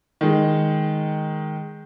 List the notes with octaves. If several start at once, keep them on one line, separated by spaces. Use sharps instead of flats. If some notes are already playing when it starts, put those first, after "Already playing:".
D#3 G#3